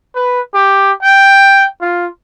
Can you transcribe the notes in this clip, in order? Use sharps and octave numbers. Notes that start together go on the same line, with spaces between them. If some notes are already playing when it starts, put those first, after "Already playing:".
B4
G4
G5
F4